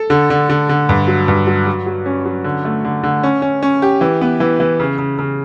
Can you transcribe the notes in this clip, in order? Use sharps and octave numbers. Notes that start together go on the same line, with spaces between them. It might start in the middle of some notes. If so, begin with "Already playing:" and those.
Already playing: A4
D3
D3
D3
D3
G2
F#3
G2
F#3
F#3
F#3
C#4
F#3
D3
A3
D3
D3
C#4
C#4
C#4
G4
E3
B3
E3
E3
C#3
C#3
C#3